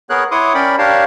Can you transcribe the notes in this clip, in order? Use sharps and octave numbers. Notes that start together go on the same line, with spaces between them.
B3 G#4 A#4 C#5 F#6
E4 C#5 F#5 C6 D6 D#6
C#4 A#4 D5 G5 B5
D4 G4 A#4 C#5 F5 A5